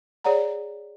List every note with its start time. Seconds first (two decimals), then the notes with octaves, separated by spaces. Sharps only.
0.24 G#4 C#5 D5 F#5 A#5